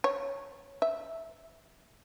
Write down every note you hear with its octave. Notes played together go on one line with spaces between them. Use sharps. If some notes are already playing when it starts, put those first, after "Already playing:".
C#5
E5